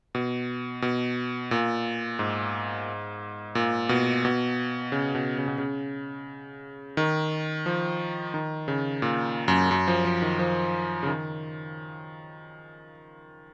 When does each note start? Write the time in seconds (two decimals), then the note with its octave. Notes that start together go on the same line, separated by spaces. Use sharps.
0.15 B2
0.82 B2
1.51 A#2
2.19 G#2
3.55 A#2
3.89 B2
4.25 B2
4.92 C#3
5.15 B2
5.38 C#3
5.48 B2
5.58 C#3
6.97 D#3
7.66 F3
8.34 D#3
8.68 C#3
9.02 A#2
9.48 F#2
9.71 F#2
9.88 F3
10.05 F3
10.22 D#3
10.39 F3
11.03 C#3
11.07 D#3